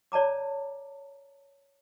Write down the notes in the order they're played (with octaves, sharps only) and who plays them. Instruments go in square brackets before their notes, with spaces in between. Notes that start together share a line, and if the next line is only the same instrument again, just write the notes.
[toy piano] C#5 D5 A5 A#5 D6